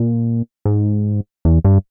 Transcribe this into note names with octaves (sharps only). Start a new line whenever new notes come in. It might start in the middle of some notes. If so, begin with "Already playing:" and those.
Already playing: A#2
G#2
E2
G2